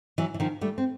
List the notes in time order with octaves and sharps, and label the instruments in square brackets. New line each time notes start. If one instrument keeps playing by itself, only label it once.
[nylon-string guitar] E3 F#3
E3
D#3 F3
G3 A3
C4